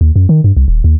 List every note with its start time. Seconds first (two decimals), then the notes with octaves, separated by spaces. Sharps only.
0.01 D#2
0.16 F#2
0.29 D#3
0.44 G2
0.57 C2
0.68 D#1
0.84 D#2